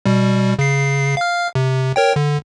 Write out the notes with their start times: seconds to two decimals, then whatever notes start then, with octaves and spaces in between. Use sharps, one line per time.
0.06 B2 G3
0.59 C#3 C7
1.17 F5 F6
1.55 C3
1.96 A#4 C#5 G5
2.16 D3